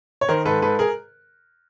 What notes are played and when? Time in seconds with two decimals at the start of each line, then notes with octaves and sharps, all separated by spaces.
0.21 C#5
0.28 D#3 A#4 C5
0.45 G#2 A4 B4
0.62 G#2 A4 B4
0.79 G#4 A#4